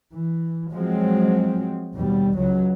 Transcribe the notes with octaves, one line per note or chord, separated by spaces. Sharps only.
E3
F3 F#3 G#3 C4
D#2 B2 G3
C#2 C#3 F#3